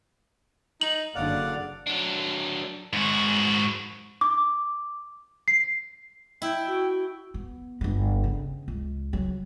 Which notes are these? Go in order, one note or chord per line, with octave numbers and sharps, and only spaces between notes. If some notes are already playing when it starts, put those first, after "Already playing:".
D#4 F#7
F#1 D3 D5 F5 F#5
F#3 D4
G#2 F#4
D6
C7
E4 G5
F#4
B3
G1 B3
C#3
C#2
F#3